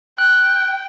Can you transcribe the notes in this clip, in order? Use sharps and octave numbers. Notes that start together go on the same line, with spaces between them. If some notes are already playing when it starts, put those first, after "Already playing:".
G5 F#6